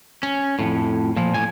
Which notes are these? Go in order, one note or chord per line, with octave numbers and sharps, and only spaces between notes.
C#4
F2 A2
A#2 F3
A2 G#5